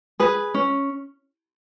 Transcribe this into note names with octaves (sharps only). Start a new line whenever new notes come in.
G#4 B4
C#4